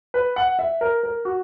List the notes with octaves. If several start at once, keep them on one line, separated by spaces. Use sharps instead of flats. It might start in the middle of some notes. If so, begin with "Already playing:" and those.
B4
F#5
E5
A#4
A#4
F#4